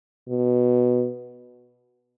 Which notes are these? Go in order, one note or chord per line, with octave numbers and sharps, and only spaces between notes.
B2